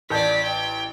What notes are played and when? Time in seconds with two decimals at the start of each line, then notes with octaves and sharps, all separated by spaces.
0.10 A1 D5 A5 G6 B6
0.43 G5